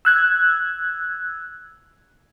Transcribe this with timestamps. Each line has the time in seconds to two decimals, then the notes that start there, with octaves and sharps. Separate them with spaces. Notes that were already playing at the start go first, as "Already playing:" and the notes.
0.05 E6 F#6 G#6